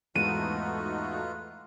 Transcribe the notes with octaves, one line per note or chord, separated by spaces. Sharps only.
E2 G#2 A3 D#4 F4 F#4 B4 D#7